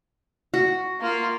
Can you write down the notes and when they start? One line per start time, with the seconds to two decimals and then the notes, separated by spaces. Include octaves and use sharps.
0.54 F#4
1.00 A#3 F4